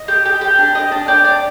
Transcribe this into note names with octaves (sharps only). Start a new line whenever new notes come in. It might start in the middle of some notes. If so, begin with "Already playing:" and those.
Already playing: D#5
G4
G4
G4 G5
D4
G4 D#5
D4
G4 D5
D4